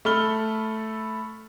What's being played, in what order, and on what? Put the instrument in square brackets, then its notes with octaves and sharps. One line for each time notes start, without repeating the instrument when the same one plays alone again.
[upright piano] A3 A4 B5 F6 G7